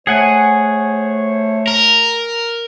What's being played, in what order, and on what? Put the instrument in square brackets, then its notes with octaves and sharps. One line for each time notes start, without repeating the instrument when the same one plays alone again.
[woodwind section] A3 C5 C#5 [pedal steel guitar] G#4 F#5 G#5
[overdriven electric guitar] A#4